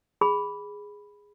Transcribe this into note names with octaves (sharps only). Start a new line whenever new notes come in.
G#4 B5